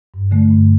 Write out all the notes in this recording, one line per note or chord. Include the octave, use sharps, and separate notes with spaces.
G2
D3 A3
G2